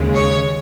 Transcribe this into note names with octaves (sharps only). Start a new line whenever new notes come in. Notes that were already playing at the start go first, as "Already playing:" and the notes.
Already playing: D#2 C#3 G#3
C#5